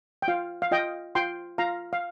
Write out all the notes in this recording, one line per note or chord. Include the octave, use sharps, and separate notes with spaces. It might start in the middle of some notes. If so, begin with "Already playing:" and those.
G5
F4 F5
F5
F4 D#5 G5
F4 G5 C6
F4 F5 A#5
F5